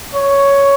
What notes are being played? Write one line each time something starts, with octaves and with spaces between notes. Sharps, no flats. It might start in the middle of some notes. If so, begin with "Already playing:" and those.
C#5